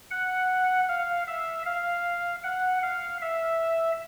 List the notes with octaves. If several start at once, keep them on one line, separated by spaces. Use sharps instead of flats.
F#5
F5
E5
F5
F#5
F5
E5